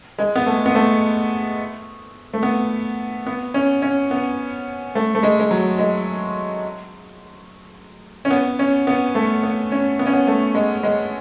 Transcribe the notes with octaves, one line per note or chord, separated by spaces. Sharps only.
G#3
B3
A3
B3
A3
A3
B3
B3
C#4
C#4
B3
A3
A3
G#3
G#3
F#3
G#3
C#4
B3
C#4
B3
A3
B3
C#4
B3
C#4
B3
A3
G#3
G#3